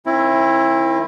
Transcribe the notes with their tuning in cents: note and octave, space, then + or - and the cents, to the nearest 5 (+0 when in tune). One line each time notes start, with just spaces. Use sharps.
D#3 +0 C4 +40 E4 +5